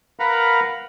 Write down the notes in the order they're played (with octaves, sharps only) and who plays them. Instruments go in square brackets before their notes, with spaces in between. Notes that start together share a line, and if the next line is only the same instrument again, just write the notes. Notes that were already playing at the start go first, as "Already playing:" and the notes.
[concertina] A#4 B4 F5 F#5 A#5 B5